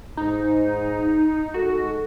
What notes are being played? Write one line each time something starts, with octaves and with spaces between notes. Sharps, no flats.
G#2 D#4
G#3 D#4 F#4 A4